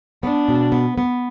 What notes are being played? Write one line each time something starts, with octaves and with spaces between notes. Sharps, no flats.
B3 D4
B2
B3
B3